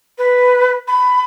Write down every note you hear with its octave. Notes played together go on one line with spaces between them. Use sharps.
B4
B5